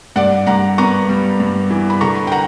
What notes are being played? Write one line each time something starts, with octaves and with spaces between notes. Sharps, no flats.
G2 D5 F#5
G2 F#5 A#5
B3 A#5 C#6
G3
G2
E3
B5
D3 A#5 C#6
G5
F#5 A#5